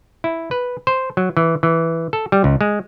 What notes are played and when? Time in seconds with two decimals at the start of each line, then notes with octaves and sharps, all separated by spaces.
0.24 E4
0.51 B4
0.87 C5
1.17 F#3
1.37 E3
1.63 E3
2.13 A4
2.32 G3
2.44 C#2
2.61 G#3